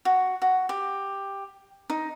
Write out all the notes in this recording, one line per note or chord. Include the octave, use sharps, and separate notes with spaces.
F#4
F#4
G4
D#4